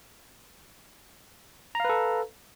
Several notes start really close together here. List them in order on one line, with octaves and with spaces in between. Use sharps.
A#5 F5 B4 A4